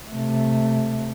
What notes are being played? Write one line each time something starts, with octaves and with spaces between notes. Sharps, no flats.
C3 A3